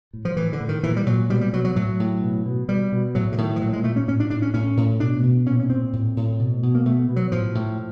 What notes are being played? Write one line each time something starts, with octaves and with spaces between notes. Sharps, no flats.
A2
F3
A2 E3
D3
A2
D#3
A#2 E3
G3
A#2 F#3
B2 G3
G3
B2 F#3
F#3
A2 F#3
A2
B2
B2
B2 G3
B2
A2 F#3
D3
A2 D#3
F3
A#2 F#3
G#3
A#2 A3
C#4
A2 C#4
D4
A2 D4
C#4
A2 C#4
A2
B2 D4
B2
A#2 C#4
C#4
A#2 C4
A2
A2
B2
B2
A#3
B2 A3
B2
F#3
A2 F3
A2